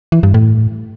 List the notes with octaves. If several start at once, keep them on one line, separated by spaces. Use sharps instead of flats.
E3
G2
A2